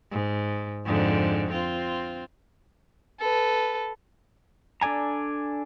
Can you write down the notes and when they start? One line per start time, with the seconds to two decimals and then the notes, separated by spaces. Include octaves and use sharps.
0.11 G#2
0.85 F2 G#2 D3
1.51 C4 F4
3.19 A4 B4
4.81 D4 A4 D5 G#5 A#5